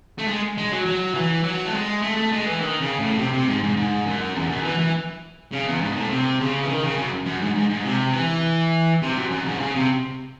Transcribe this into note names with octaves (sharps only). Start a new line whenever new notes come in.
A3
G#3
G#3
F#3
F#3
E3
F#3
A3
G#3
A3
A3
G#3
E3
D#3
C#3
A2
C3
C3
G#2
G#2
G#2
F#2
E2
F#2
E3
E3
C#3
E2
G#2
A2
C3
C#3
E3
D#3
C#3
F#2
F#2
G#2
G#2
G#2
C3
E3
C3
F#2
F#2
G#2
C3
C#3
C3